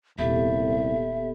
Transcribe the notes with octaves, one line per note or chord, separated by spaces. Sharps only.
D#1 C2 B3 G4 A4 E5